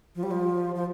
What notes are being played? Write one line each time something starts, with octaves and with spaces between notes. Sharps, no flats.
F3
G3
F3
F3